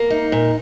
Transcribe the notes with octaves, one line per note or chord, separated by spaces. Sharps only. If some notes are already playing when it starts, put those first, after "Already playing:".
Already playing: A#3
D#4
A#2